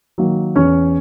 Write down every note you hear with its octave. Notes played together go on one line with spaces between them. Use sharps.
D#3 F#3 A#3
E2 C#4 C#5